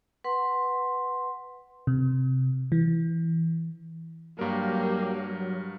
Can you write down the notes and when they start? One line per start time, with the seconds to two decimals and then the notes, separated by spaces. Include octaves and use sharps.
0.24 B4 F#5 C6
1.87 C3
2.72 E3
4.39 G2 F#3 A#3 G4 A#4